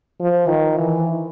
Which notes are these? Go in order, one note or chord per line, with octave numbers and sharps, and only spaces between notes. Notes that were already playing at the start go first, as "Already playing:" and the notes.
F3
D#3
E3